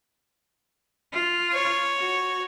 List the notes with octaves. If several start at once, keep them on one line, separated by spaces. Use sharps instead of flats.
F4
C#5
F#4